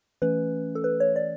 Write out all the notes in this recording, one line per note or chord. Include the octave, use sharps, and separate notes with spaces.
E3 A3 C#4 B4
A4
B4
C#5
D5